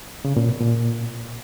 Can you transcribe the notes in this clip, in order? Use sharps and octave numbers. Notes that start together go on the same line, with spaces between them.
C#3
A#2
B2
A#2